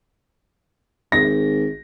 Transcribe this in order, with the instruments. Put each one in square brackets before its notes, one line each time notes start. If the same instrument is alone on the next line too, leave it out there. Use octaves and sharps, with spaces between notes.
[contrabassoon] G#1 [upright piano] A#6